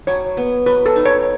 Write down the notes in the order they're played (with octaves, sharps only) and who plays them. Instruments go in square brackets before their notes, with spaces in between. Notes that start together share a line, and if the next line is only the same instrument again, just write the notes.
[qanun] F#3 [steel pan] C#5
[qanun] B3
[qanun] F#3 [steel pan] B4
[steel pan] A4
[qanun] D#4
[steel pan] C#5